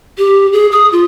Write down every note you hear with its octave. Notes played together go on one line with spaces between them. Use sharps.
G4
G#4
D#6
F4